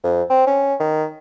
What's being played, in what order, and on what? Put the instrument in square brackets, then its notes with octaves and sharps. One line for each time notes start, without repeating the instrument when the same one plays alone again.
[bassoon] F2
C4
C#4
D#3